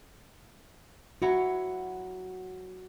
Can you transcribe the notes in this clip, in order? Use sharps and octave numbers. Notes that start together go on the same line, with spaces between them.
F#3 E4 F#4 C#5